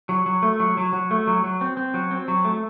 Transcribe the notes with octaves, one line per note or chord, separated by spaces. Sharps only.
F#3
F#3
A3
F#3
F#3
F#3
A3
F#3
F#3
C4
C4
F#3
C4
F#3
A3